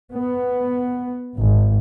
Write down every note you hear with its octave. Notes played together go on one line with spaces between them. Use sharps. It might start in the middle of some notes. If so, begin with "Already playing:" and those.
B3
G#1